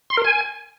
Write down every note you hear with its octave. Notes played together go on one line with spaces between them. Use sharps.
C6
A#4
G#5